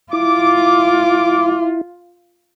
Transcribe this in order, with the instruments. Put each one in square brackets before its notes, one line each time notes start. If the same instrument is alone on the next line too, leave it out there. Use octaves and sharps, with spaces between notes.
[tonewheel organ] E4 [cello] F4 [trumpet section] D6